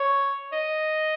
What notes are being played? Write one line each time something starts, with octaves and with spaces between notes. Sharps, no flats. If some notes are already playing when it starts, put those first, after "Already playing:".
Already playing: C#5
D#5